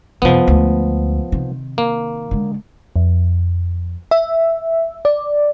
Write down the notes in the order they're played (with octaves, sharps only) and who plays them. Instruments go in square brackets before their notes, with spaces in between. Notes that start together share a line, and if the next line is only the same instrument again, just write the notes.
[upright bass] F#2 C3 [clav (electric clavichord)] F3 B3
[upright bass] D2 G#3
C3 D#3
[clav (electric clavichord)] A#3
[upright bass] D3 G#3
[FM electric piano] F2
E5
D5